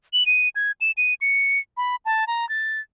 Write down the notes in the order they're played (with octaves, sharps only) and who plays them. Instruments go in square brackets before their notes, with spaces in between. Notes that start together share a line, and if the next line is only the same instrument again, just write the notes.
[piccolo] F#7
D#7
G#6
E7
D#7
C#7
B5
A5
A#5
A6